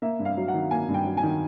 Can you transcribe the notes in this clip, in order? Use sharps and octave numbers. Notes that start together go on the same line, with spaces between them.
A#3 E5
G2
F5
F#3
F#5
D#3
A#3 G#5
G2
G5
F#3
G#5
D#3